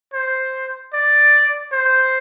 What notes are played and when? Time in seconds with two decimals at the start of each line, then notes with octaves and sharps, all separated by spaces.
0.13 C5
0.93 D5
1.72 C5